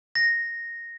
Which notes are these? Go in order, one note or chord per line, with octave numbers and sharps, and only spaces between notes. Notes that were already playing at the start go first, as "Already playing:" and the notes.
A#6